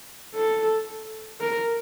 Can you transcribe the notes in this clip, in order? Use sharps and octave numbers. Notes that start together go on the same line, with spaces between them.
A4
A#4